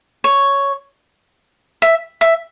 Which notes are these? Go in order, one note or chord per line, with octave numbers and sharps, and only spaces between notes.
C#5
E5
E5